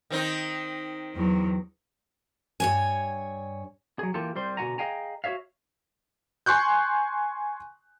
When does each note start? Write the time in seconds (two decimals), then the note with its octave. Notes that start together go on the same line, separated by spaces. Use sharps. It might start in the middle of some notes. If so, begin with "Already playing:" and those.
0.10 D#3 C4 D#4
1.16 E2 F#3
2.60 G2 C#5 G#5
3.99 F#3 G#4
4.14 E3 A#3 F4 G4 A4
4.35 C2 G3 C5 C6
4.57 B2 D3 F#4 F#5 G#5 A#5
4.78 G#4 D#5 F5 G5 G#5 A#5
5.24 F#4 G#4 C#5 E5 F5
6.46 G#5 C6 C#6 F#6 G6